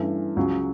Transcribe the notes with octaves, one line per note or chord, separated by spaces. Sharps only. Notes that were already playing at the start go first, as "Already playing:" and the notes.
Already playing: G2 E3 A3 C#4 E4
C#2 C#3 F#3